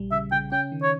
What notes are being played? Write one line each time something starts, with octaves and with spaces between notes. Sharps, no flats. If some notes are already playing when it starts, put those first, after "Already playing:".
Already playing: A#1 G3
C#3 E5
C#3 G5
C#4 G5
D#3
C#5